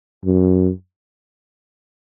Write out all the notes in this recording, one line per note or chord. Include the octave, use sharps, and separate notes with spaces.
F#2